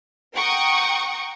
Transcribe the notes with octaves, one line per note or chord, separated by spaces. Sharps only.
F#5 G5 A#5 C#6 D#6